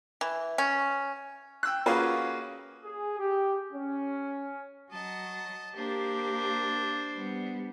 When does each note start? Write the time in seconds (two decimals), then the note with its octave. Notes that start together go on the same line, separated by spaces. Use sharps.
0.21 E3
0.58 C#4
1.63 G5 E6 F#6
1.86 A#3 C#4 F4 F#4 G#4 B4
2.84 G#4
3.19 G4
3.72 C#4
4.92 F#3 D#5 A5
5.76 A#3 D4 G4 C5
7.15 G3 B3